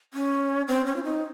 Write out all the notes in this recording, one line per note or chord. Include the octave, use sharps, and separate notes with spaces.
C#4
C4
C#4
F4
D#4